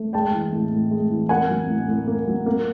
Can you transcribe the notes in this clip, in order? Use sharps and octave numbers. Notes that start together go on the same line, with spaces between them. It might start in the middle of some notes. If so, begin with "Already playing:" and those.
Already playing: A3
G#3 G5 A5
E3
A2
A2
G#3
E3
A#3 F#5 G#5
F#3
A2
A2
A#3
F#3
A#3